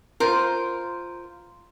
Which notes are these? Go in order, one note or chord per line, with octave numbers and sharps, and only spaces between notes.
F4 A#4 C5 C6